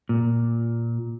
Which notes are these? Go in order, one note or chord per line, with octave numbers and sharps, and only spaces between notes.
A#2